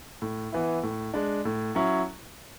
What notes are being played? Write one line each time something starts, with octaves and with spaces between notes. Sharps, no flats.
A2
E3 B3 E4
A2
G#3 D4
A2
F#3 C#4 E4